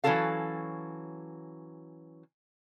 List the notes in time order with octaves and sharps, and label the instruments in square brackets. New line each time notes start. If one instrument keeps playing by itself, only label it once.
[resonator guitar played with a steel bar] E3 F#3 C#4 F#4 A4 F5